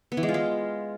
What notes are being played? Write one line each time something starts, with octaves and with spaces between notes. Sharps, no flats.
B3
E3
G#3
F4
G#3